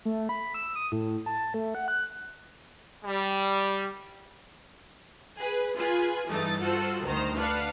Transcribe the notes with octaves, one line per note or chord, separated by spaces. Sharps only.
A3
B5
E6
D#6
A2
A5
A3
F#5
F#6
G3
G#4 B4
F4 G#4 B4 G#5
G2 E3 A3 D#4 A6
F4 F#4 A4 C5
D2 D#3 C5 A#5
D4 B4 F5 F#5